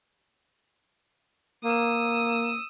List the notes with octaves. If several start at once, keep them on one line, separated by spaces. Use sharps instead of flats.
A#3 D#6 E6